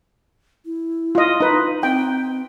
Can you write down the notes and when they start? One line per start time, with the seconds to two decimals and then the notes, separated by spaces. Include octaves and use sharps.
0.65 E4
1.15 F4 D#5
1.40 D#4 B4
1.83 C4 G5